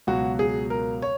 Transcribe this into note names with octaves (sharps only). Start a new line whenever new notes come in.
C#2 B2 F#3 F#4
G#4
A#4
C#5